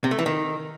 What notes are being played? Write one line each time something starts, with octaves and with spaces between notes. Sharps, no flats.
C3
A3
E3
D#3